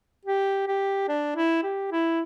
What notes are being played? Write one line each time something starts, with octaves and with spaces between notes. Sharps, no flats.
G4
G4
D4
E4
G4
E4